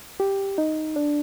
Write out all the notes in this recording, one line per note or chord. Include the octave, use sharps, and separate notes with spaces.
G4
D#4
D4